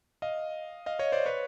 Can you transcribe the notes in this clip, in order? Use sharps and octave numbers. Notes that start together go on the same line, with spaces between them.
D#5 F5
D#5 F5
C#5 D#5
C5 D5
B4 C#5